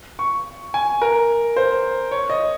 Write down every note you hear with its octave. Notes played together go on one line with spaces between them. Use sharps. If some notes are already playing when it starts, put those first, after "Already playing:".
C#6
G#5
A#4
C5
C#5
D#5